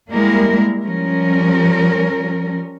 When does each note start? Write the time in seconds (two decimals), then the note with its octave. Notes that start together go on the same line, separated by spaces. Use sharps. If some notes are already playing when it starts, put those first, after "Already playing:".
0.11 G3 G#3 A#3 E4 A#4
0.83 F3 G3 C#4 A#4